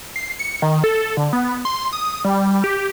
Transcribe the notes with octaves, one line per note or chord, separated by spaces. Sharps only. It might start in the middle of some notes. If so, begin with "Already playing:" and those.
C7
C#7
D#3
A4
D3
B3
C6
D#6
G3
G4